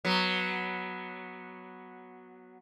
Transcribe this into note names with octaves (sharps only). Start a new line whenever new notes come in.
F#3 B3